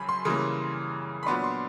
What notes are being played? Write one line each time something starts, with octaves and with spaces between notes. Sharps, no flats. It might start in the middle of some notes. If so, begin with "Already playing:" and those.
Already playing: F#2 C#3 F3 B5
C6
C#3 E3 G3 A#3
B5
A#2 F#3 B3 D4 C6
C6